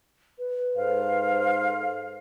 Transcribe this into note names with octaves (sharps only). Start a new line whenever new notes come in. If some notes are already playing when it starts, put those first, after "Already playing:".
B4
G#2 A4 C5 F5